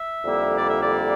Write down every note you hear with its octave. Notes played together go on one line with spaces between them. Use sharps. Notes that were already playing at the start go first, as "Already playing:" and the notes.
Already playing: E5
F2 D3 G3 A#3 E4
D5
E5
D5